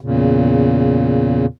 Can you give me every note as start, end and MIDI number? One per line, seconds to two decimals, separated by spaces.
0.01 1.46 40
0.01 1.46 46
0.01 1.46 49